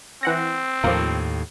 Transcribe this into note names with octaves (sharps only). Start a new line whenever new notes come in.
E3 C4 F#5 A#6
D#2 A2 F3 A#3